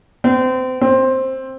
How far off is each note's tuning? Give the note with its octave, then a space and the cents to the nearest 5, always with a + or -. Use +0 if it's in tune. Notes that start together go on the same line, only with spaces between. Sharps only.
C4 -30
C4 +10